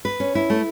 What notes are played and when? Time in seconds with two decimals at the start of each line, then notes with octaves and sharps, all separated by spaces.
0.05 B4
0.20 C#4
0.35 E4
0.50 A3